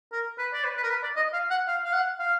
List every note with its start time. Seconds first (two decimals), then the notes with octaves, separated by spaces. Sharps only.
0.12 A#4
0.38 B4
0.53 D5
0.64 B4
0.77 B4
0.83 A#4
0.90 B4
1.03 D5
1.16 D#5
1.33 F5
1.50 F#5
1.67 F5
1.84 F5
1.93 F#5
2.19 F5